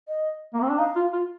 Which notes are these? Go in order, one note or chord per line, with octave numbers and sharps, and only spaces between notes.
D#5
A#3
C4
D4
D#4 F5
F4
F4